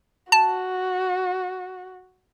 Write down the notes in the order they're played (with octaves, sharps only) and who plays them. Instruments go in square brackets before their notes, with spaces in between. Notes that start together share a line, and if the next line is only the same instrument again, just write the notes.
[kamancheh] F#4 [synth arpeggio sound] A5